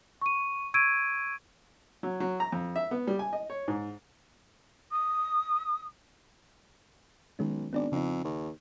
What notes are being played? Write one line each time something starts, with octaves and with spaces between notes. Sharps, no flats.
C#6 D#7
C#6 E6 G#6 D7 D#7
F#3
F#3
A#5
F2
E5
B3
G3
G#5
D#5
C#5
G#2
D#6
B1 D#3 G#3 C#4
G#1 B3 D4 D5
F2 C#3 D#4
D#2